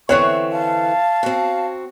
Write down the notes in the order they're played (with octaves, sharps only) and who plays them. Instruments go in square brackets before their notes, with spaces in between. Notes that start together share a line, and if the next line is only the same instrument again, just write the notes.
[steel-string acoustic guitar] D3 E3 C4 [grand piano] C#5 F#6 [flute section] C#6
[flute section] F5 A5
[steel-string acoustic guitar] C4 F#4